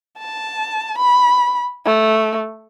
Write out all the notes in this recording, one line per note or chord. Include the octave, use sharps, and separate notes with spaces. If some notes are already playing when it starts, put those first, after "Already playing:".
A5
B5
A3